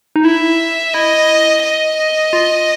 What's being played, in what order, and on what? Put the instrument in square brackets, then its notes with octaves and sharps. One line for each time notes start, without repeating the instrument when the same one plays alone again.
[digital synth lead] D#4
[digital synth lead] E4 [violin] E5
[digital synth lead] E4 [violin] D#5
[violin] D#5
[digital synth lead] F4